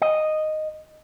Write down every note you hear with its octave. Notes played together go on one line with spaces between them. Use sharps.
D#5